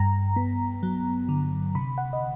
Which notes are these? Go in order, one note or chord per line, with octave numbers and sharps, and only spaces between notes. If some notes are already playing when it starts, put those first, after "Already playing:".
Already playing: G2 A#5
B3
F#3
D3
C3 B5
F#5
D#5